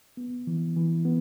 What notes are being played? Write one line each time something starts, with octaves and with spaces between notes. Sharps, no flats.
B3
E3
E3
B3